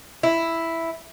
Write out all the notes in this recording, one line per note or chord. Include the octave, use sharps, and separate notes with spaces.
E4